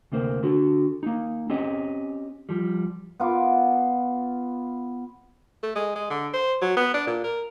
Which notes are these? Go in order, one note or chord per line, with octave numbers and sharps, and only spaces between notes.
D2 C3 A#3 C5
D3 F#4
A#3 D#4
C4 C#4 G4 C#5 D#5
F3 G3
B3 F4 D6
A3
G#3
G#3
D3
C5
F#3
B3
D4
A#2
A#4